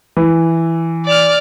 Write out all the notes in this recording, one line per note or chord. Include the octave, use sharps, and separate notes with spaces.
E3
D5 F6